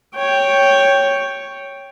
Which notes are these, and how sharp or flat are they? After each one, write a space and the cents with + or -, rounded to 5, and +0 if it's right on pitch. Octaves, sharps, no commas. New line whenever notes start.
C#5 +0 G5 +0